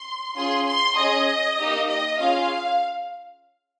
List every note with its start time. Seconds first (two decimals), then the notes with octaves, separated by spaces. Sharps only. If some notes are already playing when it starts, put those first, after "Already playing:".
Already playing: C6
0.36 C#4 F4 G#4 C6
0.67 C6
0.97 C#4 G#4 D#5
1.59 A#3 D#4 G4
1.88 D#5
2.19 C#4 F4 G#4 F5